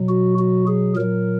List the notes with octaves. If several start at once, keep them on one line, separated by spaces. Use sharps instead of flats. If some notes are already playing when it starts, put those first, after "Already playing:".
Already playing: B2 F#3
F#4
F#4
G#4
A#2 F#3 A#4